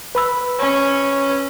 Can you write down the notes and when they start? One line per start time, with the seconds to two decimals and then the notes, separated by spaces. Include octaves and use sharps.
0.15 B4 B5 E6
0.59 C#4